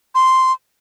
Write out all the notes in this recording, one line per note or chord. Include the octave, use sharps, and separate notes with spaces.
C6